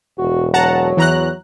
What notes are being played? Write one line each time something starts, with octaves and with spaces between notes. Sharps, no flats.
E1 F#4
F#3 F#5 A5 A#5
E2 E3 A#5 F#6